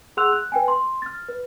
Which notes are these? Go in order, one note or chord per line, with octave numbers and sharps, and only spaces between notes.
G#4 F#5 C6 E6 F#6 F7
F#6
B4 G5 G#5
C6
F6 A6
B4